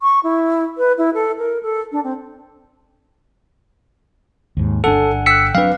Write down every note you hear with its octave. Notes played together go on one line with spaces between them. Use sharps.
C#6
E4
B4
E4
A4
A#4
A4
D4
C4
D#2 G#2
G1 C3 D4 A4 F#5 G#5
G5 E6 F#6 B6 C#7
F#3 C4 D4 B4 F5